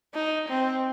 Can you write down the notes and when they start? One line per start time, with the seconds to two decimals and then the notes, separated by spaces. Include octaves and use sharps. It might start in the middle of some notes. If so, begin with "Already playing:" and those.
0.15 D#4
0.48 C4